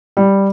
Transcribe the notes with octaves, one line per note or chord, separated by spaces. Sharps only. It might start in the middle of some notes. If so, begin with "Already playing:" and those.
G3